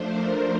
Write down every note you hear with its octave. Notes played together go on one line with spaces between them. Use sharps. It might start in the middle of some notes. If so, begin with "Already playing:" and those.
Already playing: F3 A3 D4 C5
A#4